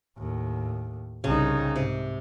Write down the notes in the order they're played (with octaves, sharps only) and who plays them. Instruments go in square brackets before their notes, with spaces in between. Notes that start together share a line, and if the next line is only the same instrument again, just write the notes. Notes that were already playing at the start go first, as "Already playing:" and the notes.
[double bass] D#2 A2
[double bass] C2 D#4 [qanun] C#3
[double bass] G#2 [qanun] C3